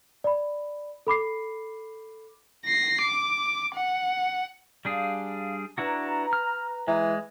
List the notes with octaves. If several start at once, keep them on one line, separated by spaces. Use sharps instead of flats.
D5 B5
A4 B5 D6 C7
A#6 C7
D6
F#5
G3 D4 G#4 F5
D4 E4 F#4 B4 A#5
F6
E3 G#3